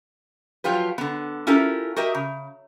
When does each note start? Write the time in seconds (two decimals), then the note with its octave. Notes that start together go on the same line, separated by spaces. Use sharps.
0.64 F3 F#3 F4 G4 B4
0.98 D3 B3
1.47 C#4 E4 F4 G4 A4 A#4
1.96 F#4 G4 A#4 D#5 E5
2.15 C#3